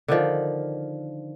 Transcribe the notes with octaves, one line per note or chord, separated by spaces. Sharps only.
D3 D#3 F3